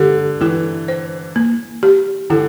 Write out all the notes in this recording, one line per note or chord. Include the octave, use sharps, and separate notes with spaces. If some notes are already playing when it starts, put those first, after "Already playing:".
Already playing: D3 G4
E3 E4
C5
A#3
G4
D3 E4